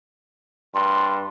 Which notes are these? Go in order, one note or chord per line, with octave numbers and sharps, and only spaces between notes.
G2 C6